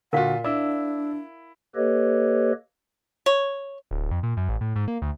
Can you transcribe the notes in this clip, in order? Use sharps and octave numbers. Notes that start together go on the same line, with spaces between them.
A#2 D3 F4 F#4 A#4 F5 F#5
D4 E4 D5 E6
A#3 G4 A4 B4 C#5 D#5
C#5
D1
F2
A#2
F#2
A1
A2
G#2
A#3
D2